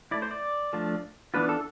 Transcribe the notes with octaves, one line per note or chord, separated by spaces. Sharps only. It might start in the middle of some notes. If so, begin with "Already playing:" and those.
A3 E4 D5
C5
D5
F3 A3 D4 F4
E3 B3 D4 F4 B4
A4